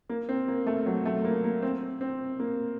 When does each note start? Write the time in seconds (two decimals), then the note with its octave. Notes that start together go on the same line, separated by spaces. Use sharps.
0.09 A#3
0.29 C4
0.48 A#3
0.67 A3
0.86 F#3
1.05 A3
1.25 A#3
1.44 A#3
1.62 C4
2.01 C4
2.40 A#3